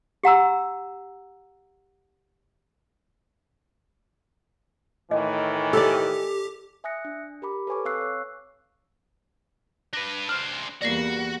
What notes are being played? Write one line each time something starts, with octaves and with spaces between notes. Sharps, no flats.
G4 F#5 A#5 E6
A2 D#3 E3 D#5
G4 A4 D5
E5 G#5 D#6 F#6 A#6 C#7
D4
G4 A#4 B5 D6
A4 B4 C#5 G#5 C#6 D6
C4 F5 C#6 E6 F#6 C7
C#5
D4 B4 A#6
D4 C5 F6
E2 G3 A#3 F#4 D5 A#6 C7